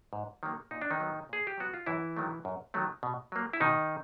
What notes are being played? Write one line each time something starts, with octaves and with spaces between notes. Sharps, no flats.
G#2
D#3 F#3 A#3
A#2 D#4
D4
D#3 D#4
F#3 B3
A#2 G#4
G4
F#3 B3 F#4
F4
F#2 E3 E4
D#3 F#3 A3
F#2
D#3 F#3 A3
B2
F#3 A#3
E4
B2 D#3 D#4